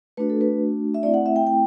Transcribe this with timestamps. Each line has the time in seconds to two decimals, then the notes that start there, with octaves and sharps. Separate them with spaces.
0.17 A3 D4 F#4 B4
0.30 A4
0.41 B4
0.94 E5
1.03 A3 C4 E4 D5
1.14 F#5
1.26 E5
1.36 G5
1.47 G5